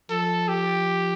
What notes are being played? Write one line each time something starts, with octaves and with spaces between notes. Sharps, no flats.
F3 A4
G4